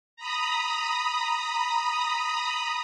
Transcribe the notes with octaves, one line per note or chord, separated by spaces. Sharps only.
A#5 B5 D#6